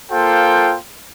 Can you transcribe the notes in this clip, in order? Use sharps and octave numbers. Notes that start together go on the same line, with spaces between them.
A#3 F4 A4 C5 G5